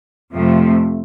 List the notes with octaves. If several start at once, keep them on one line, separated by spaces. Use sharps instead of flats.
F2 C3 F3 A3